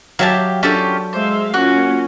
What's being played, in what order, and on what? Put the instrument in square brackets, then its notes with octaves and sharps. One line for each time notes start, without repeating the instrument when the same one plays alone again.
[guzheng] F#3 E5 A5 [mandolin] G4 F5
[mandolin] C#4 F4 G4 [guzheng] D4 A4
[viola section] G#3 E5 F5 [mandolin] C5
[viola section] A#3 C#4 F4 [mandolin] F#4